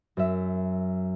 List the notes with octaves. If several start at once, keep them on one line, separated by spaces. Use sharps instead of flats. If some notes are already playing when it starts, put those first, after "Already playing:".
F#2 E5